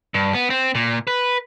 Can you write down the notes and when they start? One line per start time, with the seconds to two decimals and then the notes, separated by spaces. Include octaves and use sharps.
0.14 G2
0.34 B3
0.50 C4
0.75 A#2
1.07 B4